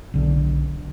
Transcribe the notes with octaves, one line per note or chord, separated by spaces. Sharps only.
B1 D3